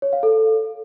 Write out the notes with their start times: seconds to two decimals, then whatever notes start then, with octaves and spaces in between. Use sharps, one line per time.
0.02 C#5
0.13 F5
0.23 A4